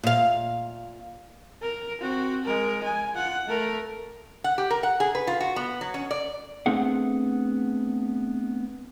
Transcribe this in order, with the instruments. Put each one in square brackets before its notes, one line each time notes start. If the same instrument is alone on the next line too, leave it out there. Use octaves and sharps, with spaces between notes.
[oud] A#2 F5
[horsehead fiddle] A#4
C4 F#4
G#3 A#4
G#5
F4 F#5
A3 A#4
[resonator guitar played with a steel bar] F#5
G4
A#4
F#5
G#4
B4
F4
F#4
B3
F#3
C#4
D5
[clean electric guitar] A3 B3 C4 D4 G#4 F#5